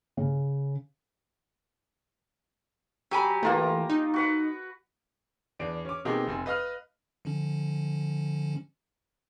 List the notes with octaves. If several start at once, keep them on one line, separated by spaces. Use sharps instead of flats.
C#3
F#3 G4 G#5 B5
E3 A3 A#3 F4 A#5
D#4
F#4 B4 F#5
E2 D4 D7
C#4 D6
B2 A#3 C4 D#4 G4 G#4
F1 C4 G#5
B4 D#5 F5 F6 F#6
D3 F3 C#4